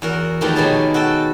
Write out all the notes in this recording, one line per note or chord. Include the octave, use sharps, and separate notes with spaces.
E2 F#4 A#4
D#3 F3 G#3 A3 G4 B4
B2 G#3 D#4 G#4 C#5 A5
F#4 A4 G5 A5